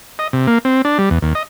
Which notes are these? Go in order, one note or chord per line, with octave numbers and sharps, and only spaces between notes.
D#5
C3
A#3
C4
D4
G3
E2
D#2
D#5